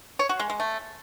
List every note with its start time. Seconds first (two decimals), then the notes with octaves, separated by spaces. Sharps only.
0.19 C#5
0.29 F#4
0.40 G#3
0.50 G#3
0.60 A3